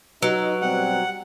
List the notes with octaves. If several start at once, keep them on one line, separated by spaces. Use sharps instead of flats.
F#3 D#4 B4
B2 G3 C4 F#5